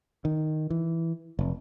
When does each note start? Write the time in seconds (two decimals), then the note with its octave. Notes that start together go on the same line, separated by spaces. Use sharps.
0.25 D#3
0.70 E3
1.39 F1